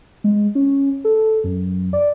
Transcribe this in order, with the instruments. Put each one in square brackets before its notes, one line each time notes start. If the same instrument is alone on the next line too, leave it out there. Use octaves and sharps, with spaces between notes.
[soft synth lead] G#3
C#4
A4
F#2
D5